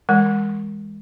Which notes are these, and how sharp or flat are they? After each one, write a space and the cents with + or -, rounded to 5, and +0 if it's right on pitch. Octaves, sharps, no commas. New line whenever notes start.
E3 -20 G#3 -25 A#4 +0